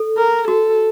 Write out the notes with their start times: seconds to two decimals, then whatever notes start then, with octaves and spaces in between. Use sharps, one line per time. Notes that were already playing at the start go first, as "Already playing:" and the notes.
Already playing: A4
0.18 A#4
0.48 F#4 A4